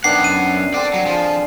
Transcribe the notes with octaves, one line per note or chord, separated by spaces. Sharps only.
F#2 D#3 B3 D4 F#5 C7
D#7
D3 C4 D4 D5 F#5
F#3
F3 F4 G#4